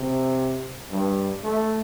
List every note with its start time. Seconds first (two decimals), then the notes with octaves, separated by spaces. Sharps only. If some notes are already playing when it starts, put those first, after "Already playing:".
Already playing: C3
0.92 G2
1.44 A3